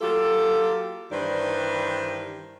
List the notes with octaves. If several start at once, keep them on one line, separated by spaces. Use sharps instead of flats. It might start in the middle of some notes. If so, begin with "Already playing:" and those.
F#3 A#3 F4 G4 A4
G2 D#3 E3 B4 C5 D5